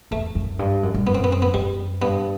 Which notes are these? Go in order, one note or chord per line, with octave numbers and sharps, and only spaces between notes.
E2 A3
F#2
G2
F#2
G2
F#2 B3
C4
B3
C4
B3
F#2 G3
G2 B3